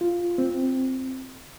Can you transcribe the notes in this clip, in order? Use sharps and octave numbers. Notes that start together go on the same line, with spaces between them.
F4
C4